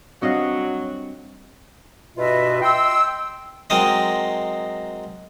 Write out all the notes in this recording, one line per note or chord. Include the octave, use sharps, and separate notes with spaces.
F#3 G3 C4 D4 F#4 D#5 F5
G2 B2 F4 B4 D#5 E5
D#5 G5 C6 E6
F#3 G#3 C4 A#4 C5 D#5